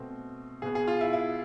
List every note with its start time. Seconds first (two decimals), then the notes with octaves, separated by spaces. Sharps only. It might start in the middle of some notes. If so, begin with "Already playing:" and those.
Already playing: B2 A3 C4
0.62 B2 B3 G#4
0.75 G#4
0.88 F4
1.01 E4
1.13 E4